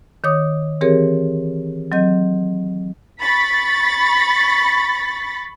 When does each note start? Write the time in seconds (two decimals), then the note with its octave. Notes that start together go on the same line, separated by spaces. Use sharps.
0.24 D#3 C#5 D6 D#6
0.81 E3 C4 G4 G#4 A#4 C#5
1.92 F#3 C4 D#5 G6
3.21 B5 C#6 A6 B6